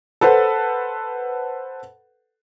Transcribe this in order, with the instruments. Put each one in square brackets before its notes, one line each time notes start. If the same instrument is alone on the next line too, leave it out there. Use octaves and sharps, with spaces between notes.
[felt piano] A4 B4 C5 F#5